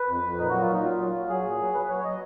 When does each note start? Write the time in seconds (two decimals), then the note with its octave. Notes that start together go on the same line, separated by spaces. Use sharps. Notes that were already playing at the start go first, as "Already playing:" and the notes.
Already playing: B4
0.09 F2
0.23 F2
0.38 A#2 D#4
0.50 F#3 F#4
0.61 F4
0.69 A#2 D#4
0.84 F#3 F4
0.99 F#3
1.14 F#3
1.29 F#3 G#4
1.44 A#2
1.59 F#3
1.74 F#3 B4
1.89 F#3 C#5
1.99 C#5
2.04 F#3 D#5